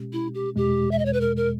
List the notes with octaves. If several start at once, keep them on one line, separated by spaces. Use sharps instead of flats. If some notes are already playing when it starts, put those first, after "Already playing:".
Already playing: B2 G#3 C#4 G4
E4
G4
E2 B2 G#3 G4
E5
D#5
C#5
B4
A#4
A#4